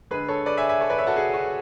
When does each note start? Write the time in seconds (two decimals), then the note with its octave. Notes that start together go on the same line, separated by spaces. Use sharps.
0.11 D3 G#3 G#4 B4
0.28 A4 C#5
0.46 B4 D5
0.57 E5 G#5
0.69 E5 G#5
0.81 A4 C#5
0.90 B4 D5
0.98 C#5 E5
1.07 F#4 A4
1.16 G#4
1.34 F#4